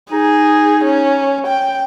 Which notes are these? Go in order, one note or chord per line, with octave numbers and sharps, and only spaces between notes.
D#4 G#4
C#4
G5